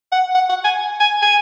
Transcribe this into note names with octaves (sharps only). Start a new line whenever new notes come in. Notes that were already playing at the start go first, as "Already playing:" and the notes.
F#5
F#5
F#5
G#5
G#5
G#5